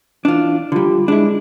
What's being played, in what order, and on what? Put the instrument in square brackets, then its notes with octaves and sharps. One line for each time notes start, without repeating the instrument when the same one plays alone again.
[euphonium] E3 [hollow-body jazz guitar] D4 F4
[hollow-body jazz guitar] D3 G3 [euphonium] F4
[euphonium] G#3 [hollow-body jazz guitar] D4 E4